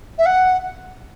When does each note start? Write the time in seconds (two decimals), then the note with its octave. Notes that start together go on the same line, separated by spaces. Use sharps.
0.18 E5
0.26 F#5